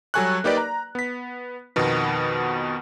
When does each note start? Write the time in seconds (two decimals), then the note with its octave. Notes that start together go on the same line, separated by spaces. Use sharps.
0.14 F#3 G3 A4 G#5 C#6 F#6
0.44 A#3 D#4 G4 B4 D5
0.57 A#5
0.95 B3 B6
1.76 F2 B2 D#3 B3